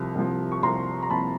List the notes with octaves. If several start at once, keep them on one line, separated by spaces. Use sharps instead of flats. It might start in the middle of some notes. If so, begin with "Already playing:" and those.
Already playing: C2 C3 F3
C2 C3 F3
C#6
C2 C3 F3 A#5 C6
A#5
C2 C3 F3 A5 B5